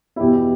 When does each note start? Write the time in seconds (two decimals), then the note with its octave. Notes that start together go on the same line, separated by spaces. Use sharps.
0.16 E4
0.20 E2 B2 G4